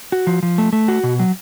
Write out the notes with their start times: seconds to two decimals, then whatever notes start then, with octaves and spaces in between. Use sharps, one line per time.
0.12 F#4
0.27 F3
0.43 F3
0.58 A3
0.73 A3
0.88 F#4
1.04 B2
1.19 F#3